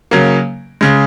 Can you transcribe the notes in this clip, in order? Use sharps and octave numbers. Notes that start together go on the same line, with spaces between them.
C#3 F#3 A#3
C#3 G#3